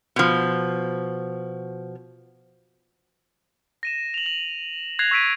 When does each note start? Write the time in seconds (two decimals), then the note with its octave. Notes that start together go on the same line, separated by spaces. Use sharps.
0.16 B2 F3
3.83 A#6 D#7 E7
4.14 F7 F#7
4.26 F#7
4.99 F#6 G#6 A#6 C7 F7
5.11 C#6 E6 B6 D7 D#7